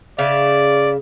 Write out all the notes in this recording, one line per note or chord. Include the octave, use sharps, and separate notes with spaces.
C#3 D5 E5 F5